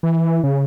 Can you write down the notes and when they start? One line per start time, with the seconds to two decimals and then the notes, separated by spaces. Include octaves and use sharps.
0.03 E3
0.44 C#3